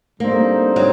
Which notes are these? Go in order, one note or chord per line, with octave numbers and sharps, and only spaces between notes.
D3 G3 A#3 C4 D#4
F#3